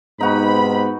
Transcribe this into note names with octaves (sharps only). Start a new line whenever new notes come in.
G#2 C3 B3 D#4 F#4 B4 B5